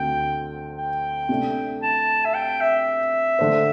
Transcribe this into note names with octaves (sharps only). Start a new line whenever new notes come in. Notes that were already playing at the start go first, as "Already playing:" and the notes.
Already playing: D2 D3 C4 G5
G5
C3 A3 D4
A5
E5
G5
E5
D3 A3 D4 C5